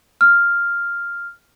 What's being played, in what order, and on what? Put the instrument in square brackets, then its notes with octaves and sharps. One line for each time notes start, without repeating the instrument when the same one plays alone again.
[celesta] F6